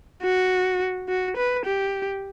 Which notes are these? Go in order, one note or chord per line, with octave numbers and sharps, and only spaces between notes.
F#4
F#4
B4
G4